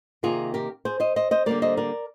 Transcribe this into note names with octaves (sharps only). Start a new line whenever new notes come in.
C3 D#3 A#3 F4 G#4
G4 A#4
G#4 C5
C5 D#5
C5 D#5
C5 D#5
D3 G3 A#3 A#4 D5
C5 D#5
A#4 D5